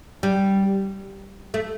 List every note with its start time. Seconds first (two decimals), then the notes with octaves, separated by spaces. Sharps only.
0.23 G3
1.54 A3